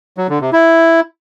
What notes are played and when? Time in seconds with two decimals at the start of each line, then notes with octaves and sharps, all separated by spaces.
0.18 F#3
0.29 D3
0.41 C3
0.53 E4